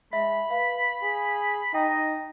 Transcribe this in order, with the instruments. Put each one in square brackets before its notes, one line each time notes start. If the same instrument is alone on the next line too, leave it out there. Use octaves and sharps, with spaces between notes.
[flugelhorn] G#3 [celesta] E5 [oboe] B5
[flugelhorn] B4 [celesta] F5
[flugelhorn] G#4
[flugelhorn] D#4 [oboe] D#5 [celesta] G5